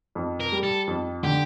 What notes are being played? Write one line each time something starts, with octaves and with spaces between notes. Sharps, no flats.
F2
A#4
G3
A4
F2
D3 G4